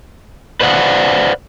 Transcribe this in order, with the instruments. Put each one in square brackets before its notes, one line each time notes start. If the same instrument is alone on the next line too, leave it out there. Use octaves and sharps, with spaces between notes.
[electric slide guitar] B4 C5 D5 F5 F#5